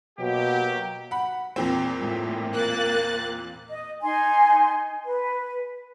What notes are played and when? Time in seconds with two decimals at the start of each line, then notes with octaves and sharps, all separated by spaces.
0.19 B2 F#3 A#3 G4
1.11 F#5 B5
1.56 E2 A#2 C4
2.00 A2
2.54 A#3 F#6 A6
3.68 D#5
4.03 D#4 G#5 C6
5.06 B4